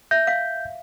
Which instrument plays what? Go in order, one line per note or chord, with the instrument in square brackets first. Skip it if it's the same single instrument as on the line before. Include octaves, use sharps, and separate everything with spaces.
[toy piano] E5 [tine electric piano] G6
[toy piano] F5